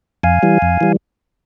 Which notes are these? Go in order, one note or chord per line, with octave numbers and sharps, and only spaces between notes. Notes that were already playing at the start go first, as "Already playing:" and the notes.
F2 F5 G#5
E3 G3
F2
E3 G3